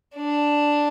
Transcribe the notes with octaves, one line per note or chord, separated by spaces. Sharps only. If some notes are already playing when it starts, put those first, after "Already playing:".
D4